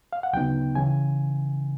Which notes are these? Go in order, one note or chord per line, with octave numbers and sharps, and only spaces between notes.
F5
F#5
D2 C#3 F#3 B3 D#4 G5
C#3 E3 G#5